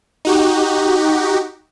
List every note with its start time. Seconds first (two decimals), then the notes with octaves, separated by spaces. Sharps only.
0.25 D#4 F#4 G4